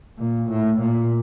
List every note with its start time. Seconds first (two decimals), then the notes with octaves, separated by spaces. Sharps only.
0.19 A#2
0.49 A2
0.80 A#2